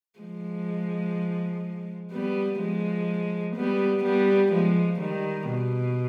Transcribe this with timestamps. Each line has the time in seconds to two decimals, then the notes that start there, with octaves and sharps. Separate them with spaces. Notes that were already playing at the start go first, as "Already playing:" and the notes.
0.20 F3 G#3
2.13 G3 B3
2.60 F3 G#3
3.56 G3 B3
4.04 G3 B3
4.52 F3 G#3
5.00 D#3 G3
5.49 B2